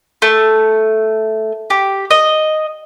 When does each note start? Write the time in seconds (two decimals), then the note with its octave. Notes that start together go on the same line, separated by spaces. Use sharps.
0.22 A3
1.70 G4
2.11 D#5